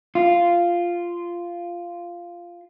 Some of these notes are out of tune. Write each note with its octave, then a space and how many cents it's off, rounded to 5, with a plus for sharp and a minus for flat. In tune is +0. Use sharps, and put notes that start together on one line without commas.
F4 -5